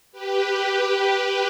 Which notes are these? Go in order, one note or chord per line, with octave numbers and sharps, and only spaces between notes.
G4 B4